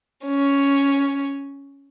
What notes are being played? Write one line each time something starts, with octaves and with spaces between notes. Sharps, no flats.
C#4